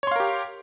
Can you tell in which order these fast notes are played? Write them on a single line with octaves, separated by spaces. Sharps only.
C#5 C6 F5 A#4 G4